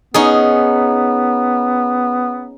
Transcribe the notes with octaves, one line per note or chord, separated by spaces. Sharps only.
B3 C#4 D#4 G#4